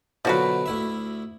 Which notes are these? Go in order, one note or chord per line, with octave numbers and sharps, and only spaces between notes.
B2 D3 F3 F#3 F#4 B4
D2 E4 E5